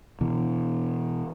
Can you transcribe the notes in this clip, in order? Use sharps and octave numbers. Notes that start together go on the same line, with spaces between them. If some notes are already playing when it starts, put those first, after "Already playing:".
B2 E3